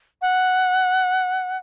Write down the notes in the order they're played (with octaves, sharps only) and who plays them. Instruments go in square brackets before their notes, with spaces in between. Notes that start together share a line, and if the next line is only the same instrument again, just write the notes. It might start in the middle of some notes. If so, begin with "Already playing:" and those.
[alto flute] F#5